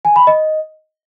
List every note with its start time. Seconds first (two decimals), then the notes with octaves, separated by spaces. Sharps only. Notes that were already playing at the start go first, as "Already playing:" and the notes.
0.05 G#5
0.16 B5
0.27 D#5